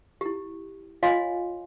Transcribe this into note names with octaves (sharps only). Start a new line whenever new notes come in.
E4 G4
F4 C#5 D#5 F5 G#5 C6